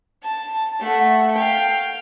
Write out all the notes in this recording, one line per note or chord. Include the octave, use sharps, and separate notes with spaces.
A5
A3 F#5
F5 G5